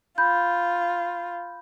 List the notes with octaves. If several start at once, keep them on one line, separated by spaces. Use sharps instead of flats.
F4 B5 G6